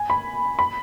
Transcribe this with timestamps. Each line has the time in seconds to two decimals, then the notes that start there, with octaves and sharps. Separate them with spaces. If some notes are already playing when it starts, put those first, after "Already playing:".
Already playing: G#5
0.10 B5
0.59 B5